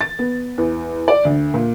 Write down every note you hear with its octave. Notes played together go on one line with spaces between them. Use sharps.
A6
B3
E2
D5
D2
A#2